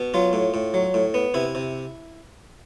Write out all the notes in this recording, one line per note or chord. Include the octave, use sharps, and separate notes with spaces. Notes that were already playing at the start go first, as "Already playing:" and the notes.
Already playing: B2
F#3 F4
A2
A2
F#3
A2
B3
C3 E4
C3